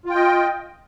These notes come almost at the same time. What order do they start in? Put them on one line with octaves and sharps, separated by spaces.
F4 G5 D#5